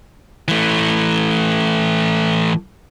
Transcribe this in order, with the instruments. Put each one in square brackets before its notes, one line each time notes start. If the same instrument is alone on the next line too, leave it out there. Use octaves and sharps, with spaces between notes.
[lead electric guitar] E3 A3